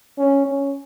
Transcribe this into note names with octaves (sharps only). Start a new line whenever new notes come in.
C#4
C#4